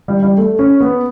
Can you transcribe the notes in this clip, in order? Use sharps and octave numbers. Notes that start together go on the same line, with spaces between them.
G3
G3
A3
C#4
B3